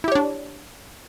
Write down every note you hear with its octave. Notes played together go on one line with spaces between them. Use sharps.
D4 E4 G4 C#5